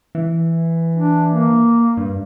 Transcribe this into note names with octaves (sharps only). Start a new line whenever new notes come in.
E3
D4
A#3
G2